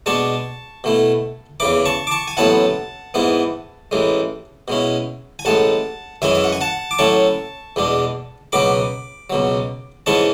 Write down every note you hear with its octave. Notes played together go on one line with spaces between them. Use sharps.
B2 G#3 D4 A5 C#6
B2 A3 E4
E2 C#3 E3 B5 D6
A5 C#6
D6
A5 C#6
G#5
A1 A2 F#3 B3 E4 F#5 A5
G#2 E3 B3 E4
A1 A2 E3 G#3
B2 G#3 C#4 E4
G#5
A1 A2 G#3 F#5 A5
F#2 E3 G#3 C#4 E5 G#5
E5
F#5
G#5
F#5 A5
D6
A2 F#3 C#4 E4 A5 C#6
E2 B2 G#3 D4
C#2 B2 F#3 B3 B5 D6
C#2 B2 F#3
G#2 E3 G#3 C#4 E4 A5 C#6